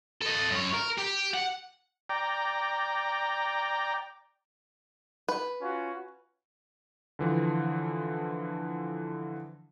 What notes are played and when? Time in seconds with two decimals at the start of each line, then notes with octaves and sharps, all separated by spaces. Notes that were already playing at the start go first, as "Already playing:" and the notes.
0.22 A4 D#5
0.51 F#2 C#5
0.73 A#4
0.98 G4
1.34 F#5
2.09 D5 G5 A#5
5.29 B4
5.60 C#4 F4 F#4
7.19 D3 E3 F3